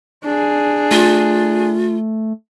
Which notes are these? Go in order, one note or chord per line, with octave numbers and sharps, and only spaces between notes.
D4 G#4
A3 F4